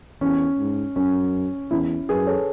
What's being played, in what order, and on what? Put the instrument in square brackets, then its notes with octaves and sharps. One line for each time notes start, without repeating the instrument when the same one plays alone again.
[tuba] E2 [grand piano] C#4
[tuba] G#2
[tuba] F#2 [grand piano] C#4
[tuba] E2 [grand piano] C#4 E4
[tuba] F#2 [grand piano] G#4 B4
[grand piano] A4 C#5